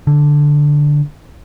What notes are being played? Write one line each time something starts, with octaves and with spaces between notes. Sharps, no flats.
D3